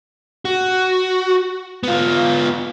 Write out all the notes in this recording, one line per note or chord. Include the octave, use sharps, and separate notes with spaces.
F#4
B3 F4